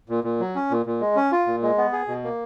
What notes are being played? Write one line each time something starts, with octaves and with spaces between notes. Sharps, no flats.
A#2
A#2
F#3
C#4
A#2
A#2
G#3
C#4
F4
A#2
G#3
B3
G#4
B2
A#3